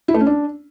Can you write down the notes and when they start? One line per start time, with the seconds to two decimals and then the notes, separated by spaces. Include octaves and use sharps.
0.08 E4
0.14 A3
0.20 C#4
0.27 D4